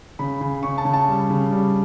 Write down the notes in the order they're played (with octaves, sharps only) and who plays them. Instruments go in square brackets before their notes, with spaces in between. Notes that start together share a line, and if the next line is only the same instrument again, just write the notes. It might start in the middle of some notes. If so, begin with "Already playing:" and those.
[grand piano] C#3 B5
C#3
C#3 C#6
A5
C#3
A5
G3
C#3
G3